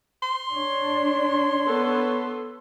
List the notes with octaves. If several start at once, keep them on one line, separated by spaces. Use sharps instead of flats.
C6
D4 C#5
B3 A4 B4